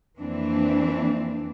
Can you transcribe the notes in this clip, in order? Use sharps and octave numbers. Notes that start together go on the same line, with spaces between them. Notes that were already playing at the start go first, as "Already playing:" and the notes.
F2 E3 A#3 C4 D4